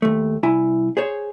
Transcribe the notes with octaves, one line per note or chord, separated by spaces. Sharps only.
D#2 A3
C2 E4 G#5
G#4 C5 C#5